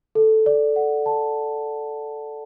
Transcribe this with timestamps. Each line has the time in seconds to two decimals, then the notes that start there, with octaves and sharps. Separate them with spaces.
0.15 A4
0.46 D5
0.76 F#5
1.06 A5